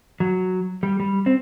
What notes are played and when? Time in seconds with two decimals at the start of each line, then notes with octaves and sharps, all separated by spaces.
0.20 F#3
0.83 G3
1.00 G3
1.26 C4